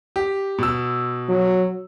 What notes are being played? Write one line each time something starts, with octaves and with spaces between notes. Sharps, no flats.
G4
B2 E6
F#3